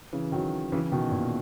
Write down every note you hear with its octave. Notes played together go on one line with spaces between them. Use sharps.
C#3 E3
D#3 F#3
C#3 E3
B2 D#3
A#2